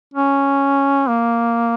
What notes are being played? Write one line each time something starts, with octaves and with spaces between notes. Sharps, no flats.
C#4
A#3